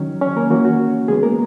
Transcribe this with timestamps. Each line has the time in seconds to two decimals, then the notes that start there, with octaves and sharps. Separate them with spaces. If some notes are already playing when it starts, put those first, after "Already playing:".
Already playing: D#3 F#3 C#4
0.21 C#4 C#5
0.36 A#3 A#4
0.50 E3 A#3 C#4 F#4
0.65 F#4
1.08 C#3 G#3 B3 G#4
1.23 A#3 A#4